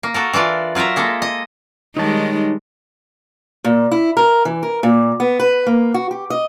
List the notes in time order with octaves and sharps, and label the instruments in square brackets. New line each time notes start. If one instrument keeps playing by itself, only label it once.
[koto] A#3
F#4 A4 A#4
E3 D4 F4 D5
F#3 F4 A#4 E5 A#5
G#3 A#3 A4
D#5
[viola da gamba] D#3 G3 G#3 [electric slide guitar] D#4 C#5 A5
[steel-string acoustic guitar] A#2
E4
A#4
E3
A#4
A#2
B3
B4
A#3
F#4
G4
D#5